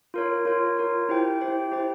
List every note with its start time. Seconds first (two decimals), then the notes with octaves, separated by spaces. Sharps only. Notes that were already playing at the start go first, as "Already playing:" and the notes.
0.14 F4 A#4 C#5
0.45 F4 A#4 C#5
0.77 F4 A#4 C#5
1.09 E4 G4 C5 G5
1.41 E4 G4 C5 G5
1.72 E4 G4 C5 G5